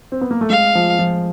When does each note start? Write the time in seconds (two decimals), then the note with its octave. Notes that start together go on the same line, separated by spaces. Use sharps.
0.12 C4
0.21 B3
0.31 A#3
0.41 A3
0.50 G#3 F5
0.75 F3
0.99 F3